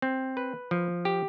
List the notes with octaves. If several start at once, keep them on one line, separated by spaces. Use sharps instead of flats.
C4
B4
F3
G4